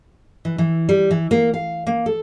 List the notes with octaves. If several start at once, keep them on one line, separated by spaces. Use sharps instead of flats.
E3
E3
G3
E3
A#3
F5
A#3
A4